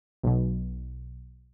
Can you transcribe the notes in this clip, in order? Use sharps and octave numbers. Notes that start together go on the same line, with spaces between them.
B1 B2